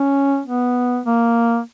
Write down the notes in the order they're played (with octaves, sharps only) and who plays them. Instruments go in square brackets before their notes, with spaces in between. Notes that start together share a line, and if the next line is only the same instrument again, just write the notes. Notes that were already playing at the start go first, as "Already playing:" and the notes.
Already playing: [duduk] C#4
B3
A#3